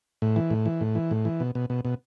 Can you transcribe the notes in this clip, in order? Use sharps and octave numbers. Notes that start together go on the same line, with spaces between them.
A2
E3
A2
E3
A2
E3
A2
E3
B2
B2
B2
B2